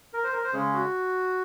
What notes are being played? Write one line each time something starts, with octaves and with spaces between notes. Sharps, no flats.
A#4
C5
A#4
C5
C#3 G#3 C#4 G#4
F#4